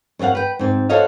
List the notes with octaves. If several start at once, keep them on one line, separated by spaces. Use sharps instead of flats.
F#2 C4 A4 F5 F#5
B4 G5
G#2 C4
F#4 A4 C5 C#5 D#5 F5